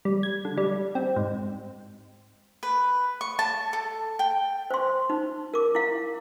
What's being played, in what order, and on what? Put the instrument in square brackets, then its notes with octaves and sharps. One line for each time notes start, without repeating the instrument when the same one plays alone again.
[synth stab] G3
G#6
D3
G3
C4
G#2
[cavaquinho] B4
C#6
A5
A4
G5
[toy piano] C5 C6
D#4
A#4 D6
E4 F5